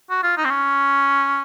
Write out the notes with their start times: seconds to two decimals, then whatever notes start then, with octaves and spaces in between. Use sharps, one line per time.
0.10 F#4
0.23 F4
0.37 D#4
0.45 C4
0.50 C#4